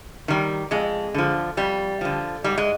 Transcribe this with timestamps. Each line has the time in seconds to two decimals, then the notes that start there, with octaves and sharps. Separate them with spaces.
0.28 D#3 G3
0.71 F2 G#3
1.14 D3 F3
1.57 F2 G3
2.01 D3 F3
2.44 G#2 G3
2.58 G#3